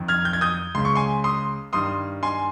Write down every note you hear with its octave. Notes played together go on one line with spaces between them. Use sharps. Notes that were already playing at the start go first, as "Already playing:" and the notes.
Already playing: F2 D#3
F6 G#6
G6
G#6
D#6 G6
C#2 C#3 C6
C#6
G#5 C6
C6 D#6
G2 D#3 C6 D#6
G#5 C6